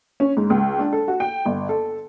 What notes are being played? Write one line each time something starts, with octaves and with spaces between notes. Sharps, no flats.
C#4
G#2
C#2
D4
A4
F#4
G5
G1
A4